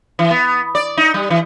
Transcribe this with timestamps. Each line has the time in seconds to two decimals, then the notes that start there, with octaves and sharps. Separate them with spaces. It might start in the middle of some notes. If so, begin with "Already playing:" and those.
0.19 E3
0.31 B3
0.75 D5
0.97 D#4
1.14 G3
1.30 E3